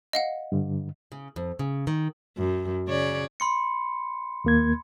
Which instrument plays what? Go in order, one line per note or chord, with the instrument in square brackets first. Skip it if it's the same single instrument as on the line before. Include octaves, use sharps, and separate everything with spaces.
[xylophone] D#5 F5 F#5
[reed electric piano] G2 D3
[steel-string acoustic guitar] C#3
F2
C#3
D#3
[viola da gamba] F#2
C#3 C#5 D5
[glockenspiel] B5 C6 C#7
[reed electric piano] D#2 A#3 G#6